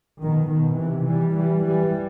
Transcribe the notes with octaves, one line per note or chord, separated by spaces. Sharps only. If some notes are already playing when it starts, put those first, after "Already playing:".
B2 D#3
B2 D#3
C3 E3
E3 G3
E3 G3
E3 G3